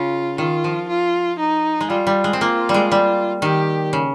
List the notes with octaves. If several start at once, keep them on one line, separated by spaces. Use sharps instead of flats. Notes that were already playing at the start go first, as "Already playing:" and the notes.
Already playing: C#3 F4
D#3 F4
F3
F4
D#4
G#3
G3 F4
G3
G#3
C4
A#3 F4
G3
G#3
G3
D#3 G4
C#3